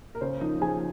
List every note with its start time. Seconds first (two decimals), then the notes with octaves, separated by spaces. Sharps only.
0.15 A#4
0.21 C#3 C5
0.41 F3 D#4 D#5
0.61 F3 G#4 G#5